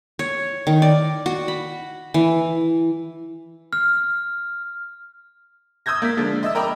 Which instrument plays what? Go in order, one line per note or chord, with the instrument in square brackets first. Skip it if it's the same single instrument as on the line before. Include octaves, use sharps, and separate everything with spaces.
[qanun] C#5
D#3
D5
F#4
B5
E3
[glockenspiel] F6
[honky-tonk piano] D#6 E6 G6 G#6 A#6
A#3 B6
D3 F3 G#3 A#3
D#5 E5 E6
A#4 D#5 G5 A#5 B5 D6